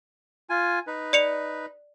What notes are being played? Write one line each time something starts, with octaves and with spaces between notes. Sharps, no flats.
F4 G#5
D#4 B4
D5 C#7 F7